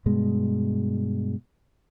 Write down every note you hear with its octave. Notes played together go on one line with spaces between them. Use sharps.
G2 B2 G#3